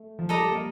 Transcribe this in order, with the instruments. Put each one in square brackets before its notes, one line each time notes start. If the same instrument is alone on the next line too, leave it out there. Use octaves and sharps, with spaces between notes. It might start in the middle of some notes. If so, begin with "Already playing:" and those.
Already playing: [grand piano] A3
F3
[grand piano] G3 [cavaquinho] A4 D#5 A#5 D6
[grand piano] G3
A#3